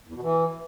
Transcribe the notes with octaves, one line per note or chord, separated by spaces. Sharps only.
E2
B2
E3